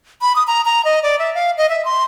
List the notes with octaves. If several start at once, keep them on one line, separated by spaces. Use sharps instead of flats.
B5
D#6
A#5
A#5
D#5
D5
E5
F5
D#5
E5
C6